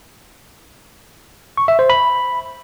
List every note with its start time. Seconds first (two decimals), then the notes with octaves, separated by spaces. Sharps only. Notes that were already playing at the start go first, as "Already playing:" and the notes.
1.57 C#6
1.68 E5
1.79 C5
1.90 B5